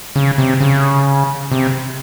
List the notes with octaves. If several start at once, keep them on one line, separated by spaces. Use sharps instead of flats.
C#3
C3
C#3
C3